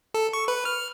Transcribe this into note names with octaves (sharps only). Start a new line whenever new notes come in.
A4
C#6
B4
F6